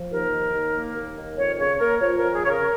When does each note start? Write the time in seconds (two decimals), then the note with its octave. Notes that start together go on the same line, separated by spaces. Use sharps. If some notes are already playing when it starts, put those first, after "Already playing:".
Already playing: F3
0.10 D#2 A#4
0.32 D#3
0.53 D#2
0.74 A#3
0.96 D#2
1.16 D#3
1.37 F2 C#5
1.58 C#3 C#5
1.80 A#3 A#4
2.00 F3 C#5
2.17 A#4
2.22 F2
2.33 G#4
2.44 C#3 C#5
2.49 A#4